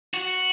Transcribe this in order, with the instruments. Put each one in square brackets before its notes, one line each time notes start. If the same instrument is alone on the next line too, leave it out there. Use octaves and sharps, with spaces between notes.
[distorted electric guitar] F#4